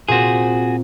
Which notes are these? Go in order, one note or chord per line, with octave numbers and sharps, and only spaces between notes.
A#2 C4 F#4 G#4